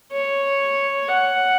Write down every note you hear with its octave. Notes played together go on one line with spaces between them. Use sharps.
C#5
F#5